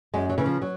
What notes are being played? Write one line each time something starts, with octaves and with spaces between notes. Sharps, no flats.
F#2 G#3
F#3
C#3 E3
F3
F#3